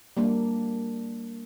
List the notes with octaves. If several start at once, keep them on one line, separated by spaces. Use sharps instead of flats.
G3 A#3 D4